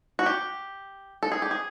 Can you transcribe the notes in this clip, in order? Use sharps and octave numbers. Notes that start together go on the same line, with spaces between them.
F#4
G4
A4
G#4
G4
G#4